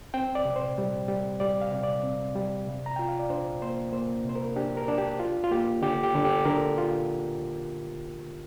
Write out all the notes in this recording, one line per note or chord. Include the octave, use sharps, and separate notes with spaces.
C4 G5
D5
C3
C5
G3
G3
G3 D5
F5
C3
D5
C4
G3
C3
A#5
F4 G5
F5
D5
D4 C5
A#3 C5
A#3 C5
C3 C5
A#4
D4 G4
A#4
D4
G4
F4
F4
A#3 G4
D3 G4
G4
D3
G4
D3 A#4
F4